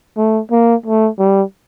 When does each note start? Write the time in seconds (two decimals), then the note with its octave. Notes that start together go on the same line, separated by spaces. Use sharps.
0.17 A3
0.51 A#3
0.86 A3
1.19 G3